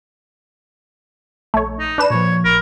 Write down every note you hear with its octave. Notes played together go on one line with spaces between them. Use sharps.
A#1 A3 C#5
D#4
D4 B4 E7
A#2 F3 C#5
A1 A#4 B5